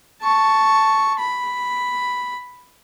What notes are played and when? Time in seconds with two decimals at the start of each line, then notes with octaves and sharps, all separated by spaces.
0.22 A5 C#6
1.19 B5